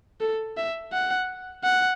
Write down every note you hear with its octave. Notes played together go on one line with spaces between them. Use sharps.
A4
E5
F#5
F#5